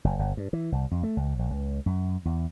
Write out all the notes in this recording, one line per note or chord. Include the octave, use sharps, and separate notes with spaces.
F#1
G1
G2
E3
C2
F2
A3
C#2
A#1
C#2
F#2
E2